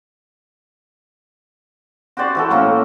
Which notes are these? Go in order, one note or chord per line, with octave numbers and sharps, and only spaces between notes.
F#4 G4 C5 D5
E3 F#4 A4
A2 A#3 C#4 C#6